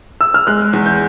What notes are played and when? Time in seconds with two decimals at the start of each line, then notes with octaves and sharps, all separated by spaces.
0.21 E6
0.34 F6
0.47 G#3 F#6
0.73 E2
0.86 G6